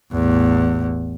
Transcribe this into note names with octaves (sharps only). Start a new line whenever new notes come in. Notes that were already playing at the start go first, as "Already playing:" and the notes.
A1 E2